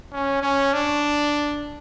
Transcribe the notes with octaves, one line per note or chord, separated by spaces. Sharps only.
C#4
C#4
D4